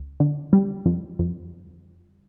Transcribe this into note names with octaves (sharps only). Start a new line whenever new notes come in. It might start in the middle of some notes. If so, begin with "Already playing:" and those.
Already playing: C#2
D3
G3
F2
F2